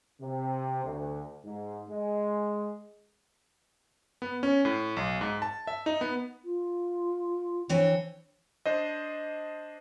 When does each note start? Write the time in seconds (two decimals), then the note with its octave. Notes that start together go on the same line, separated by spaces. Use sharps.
0.21 C3
0.84 D2
1.44 G#2
1.89 G#3
4.22 B3
4.43 C#4
4.65 A2
4.97 B1
5.21 G#2
5.42 A5
5.67 E5
5.86 D#4
6.01 B3
6.45 F4
7.69 E3 C4 D4 C#5
8.66 D4 C5 D#5